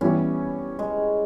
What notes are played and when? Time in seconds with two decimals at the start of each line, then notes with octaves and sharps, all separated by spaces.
0.01 E3 G3 B3 C#4 E4 G4
0.79 G#3